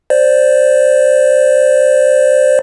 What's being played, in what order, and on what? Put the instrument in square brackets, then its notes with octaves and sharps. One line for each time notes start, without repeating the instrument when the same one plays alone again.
[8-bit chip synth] C5 D5